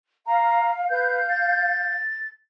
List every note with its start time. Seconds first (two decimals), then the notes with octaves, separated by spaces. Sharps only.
0.26 F5 A#5
0.90 B4 F5 G6
1.30 A6